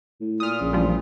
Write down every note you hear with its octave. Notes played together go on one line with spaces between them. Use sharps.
A2
A#2 D#6 F6
A#1 C#3
A1 F3 G3